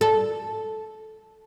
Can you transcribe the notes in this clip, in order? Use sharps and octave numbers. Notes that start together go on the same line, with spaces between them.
A4